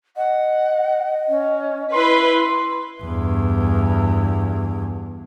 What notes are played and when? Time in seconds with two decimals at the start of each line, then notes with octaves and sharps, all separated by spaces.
0.16 D#5 F#5
1.28 C#4
1.94 E4 B4 C6
3.03 E2 G2